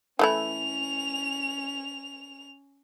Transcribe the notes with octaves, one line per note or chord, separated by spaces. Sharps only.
E3 A3 C#4 E4 F7